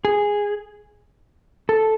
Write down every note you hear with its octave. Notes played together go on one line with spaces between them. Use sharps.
G#4
A4